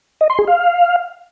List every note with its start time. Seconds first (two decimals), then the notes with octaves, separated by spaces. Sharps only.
0.21 D#5
0.30 C6
0.39 G#4
0.47 F5